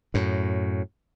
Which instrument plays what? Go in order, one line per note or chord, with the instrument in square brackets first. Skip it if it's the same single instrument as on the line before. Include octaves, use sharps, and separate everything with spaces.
[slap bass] F#2 A2